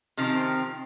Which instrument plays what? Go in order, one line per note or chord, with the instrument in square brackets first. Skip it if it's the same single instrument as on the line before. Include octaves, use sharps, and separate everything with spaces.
[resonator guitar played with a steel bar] C3 D#3 F3 C4